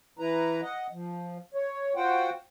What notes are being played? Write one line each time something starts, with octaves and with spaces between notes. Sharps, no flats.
E3 E4 B4 A#5
D#5 F#5
F3
C#5
F4 F#4 C5 F#5 G5